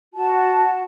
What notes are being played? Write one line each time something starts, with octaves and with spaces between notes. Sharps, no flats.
F#4 A5